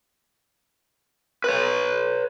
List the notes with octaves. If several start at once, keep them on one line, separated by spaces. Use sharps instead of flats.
B4 C#5